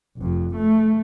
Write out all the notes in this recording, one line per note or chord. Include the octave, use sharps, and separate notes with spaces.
F1 F2
A3